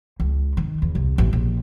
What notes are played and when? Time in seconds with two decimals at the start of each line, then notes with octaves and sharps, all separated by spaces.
0.20 C#2
0.57 D#3
0.82 E2
0.95 C2
1.18 A1
1.33 A#1